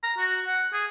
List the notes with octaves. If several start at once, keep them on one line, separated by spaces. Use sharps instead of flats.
A#5
F#4
F#5
G#4